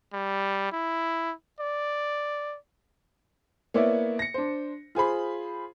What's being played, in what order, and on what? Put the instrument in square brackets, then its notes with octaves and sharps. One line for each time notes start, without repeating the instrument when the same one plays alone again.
[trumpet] G3
E4
D5
[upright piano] A#3 B3 E4 C#5 D5 E5
A#6 C#7
D4 C5
F4 G#4 C5 B5